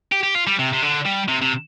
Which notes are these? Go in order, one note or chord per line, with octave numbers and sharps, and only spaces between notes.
G4
G4
F4
G3
C3
C3
D3
G3
C3
C3